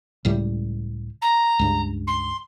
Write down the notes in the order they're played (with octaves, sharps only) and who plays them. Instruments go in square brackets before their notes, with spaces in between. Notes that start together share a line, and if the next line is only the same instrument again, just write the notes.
[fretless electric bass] C#2 A2 G3
[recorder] A#5
[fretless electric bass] C#2 G2
[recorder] C6